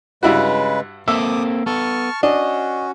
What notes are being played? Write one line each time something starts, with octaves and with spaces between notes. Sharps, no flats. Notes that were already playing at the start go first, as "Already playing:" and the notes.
G2 C#3 G#3 E4 F#4 B4
A#3 C4 A4 E5 D6 D#6
B3 A4 A5 C#6 F6
C#4 D4 F#4 D#5